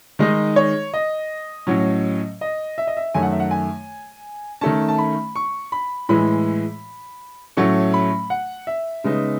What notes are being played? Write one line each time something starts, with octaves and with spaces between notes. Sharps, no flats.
D#3 G#3 D#4 D#5
C#5
D#5
A2 F#3 C#4
D#5
E5
D#5
E5
F#2 D#3 A3 G#5
F#5
E5
F#5
G#5
D#3 A3 C#4 A5
A5
B5
C#6
B5
A2 E3 G#3 B5
A2 F#3 A3 C#4 C#6
B5
F#5
E5
C#3 G#3 B3 D#4